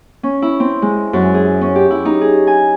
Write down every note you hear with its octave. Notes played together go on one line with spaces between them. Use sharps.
C#4
E4
C4
G#3
F#2
G#4
C#4
G4
E4
D#4
G#4
G#5